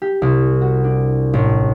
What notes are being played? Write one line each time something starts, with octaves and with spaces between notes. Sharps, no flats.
G4
C2
F#4
D4
A1